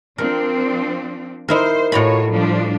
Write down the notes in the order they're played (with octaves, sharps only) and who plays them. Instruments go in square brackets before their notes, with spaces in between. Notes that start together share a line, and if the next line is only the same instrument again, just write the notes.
[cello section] F3 C4 D4 [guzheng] A#4
[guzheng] D#4 E4 A#4 [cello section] C5
[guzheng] A2 A#5 B5 [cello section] F4 F#4 C#5
[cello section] F3 G3 D4